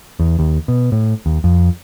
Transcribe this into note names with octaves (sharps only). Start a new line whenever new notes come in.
E2
D#2
B2
A2
D#2
F2